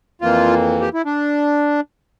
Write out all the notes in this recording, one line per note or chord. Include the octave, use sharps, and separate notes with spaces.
F2 E3 A#3 F4
G4
E4
D4